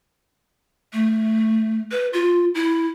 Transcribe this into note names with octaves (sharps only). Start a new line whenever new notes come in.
A3
B4
F4
E4